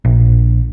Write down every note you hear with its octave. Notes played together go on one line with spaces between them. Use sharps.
A#1